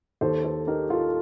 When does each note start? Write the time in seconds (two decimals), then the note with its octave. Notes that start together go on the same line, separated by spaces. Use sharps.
0.21 D#2 A4 C5
0.44 A4 C5
0.67 D#4 G4 A#4
0.90 F4 A4